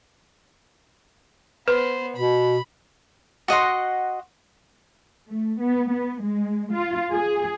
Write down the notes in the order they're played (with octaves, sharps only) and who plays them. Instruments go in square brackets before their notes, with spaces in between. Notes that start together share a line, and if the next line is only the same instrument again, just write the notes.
[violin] B3 C5 [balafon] B4
[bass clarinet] B2 [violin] B5
[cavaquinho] F#4 D#5 F#5 C6
[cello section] A3
B3
B3
G#3
F4
G#4